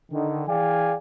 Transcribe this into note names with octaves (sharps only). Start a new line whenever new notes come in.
D3 D#3
E3 G#4 D5 F5 G5 G#5